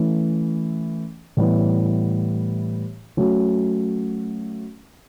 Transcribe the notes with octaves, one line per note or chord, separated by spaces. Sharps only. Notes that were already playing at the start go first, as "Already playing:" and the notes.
Already playing: E3 A3 C#4
A2 E3 G3 B3
F#3 A3 C#4 F#4